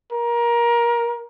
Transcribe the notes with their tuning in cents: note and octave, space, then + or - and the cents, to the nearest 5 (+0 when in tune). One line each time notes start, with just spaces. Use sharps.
A#4 +20